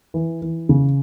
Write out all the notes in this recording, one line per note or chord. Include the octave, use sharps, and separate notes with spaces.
E3
E3
C#3